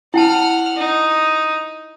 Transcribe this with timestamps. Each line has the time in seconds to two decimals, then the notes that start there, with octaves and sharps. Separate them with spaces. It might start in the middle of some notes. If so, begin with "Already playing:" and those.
0.14 E4 F#5 G5 A5 F6
0.76 D#4